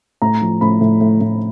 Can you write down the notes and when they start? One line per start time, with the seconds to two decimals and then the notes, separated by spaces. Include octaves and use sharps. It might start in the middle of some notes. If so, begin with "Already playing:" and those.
0.22 A2 A#5
0.42 F3
0.61 A2 B5
0.81 A2
1.01 A2
1.21 A2